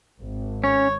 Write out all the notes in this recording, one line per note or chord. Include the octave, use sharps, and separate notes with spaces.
G#1
C#4 C#5